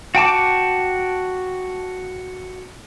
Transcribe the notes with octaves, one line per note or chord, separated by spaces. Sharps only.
F#4 G5 A5 D6